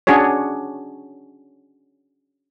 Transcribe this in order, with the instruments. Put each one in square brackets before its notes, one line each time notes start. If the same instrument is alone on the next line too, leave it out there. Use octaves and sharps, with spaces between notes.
[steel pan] C#4 D4 F#4 G#4 C#5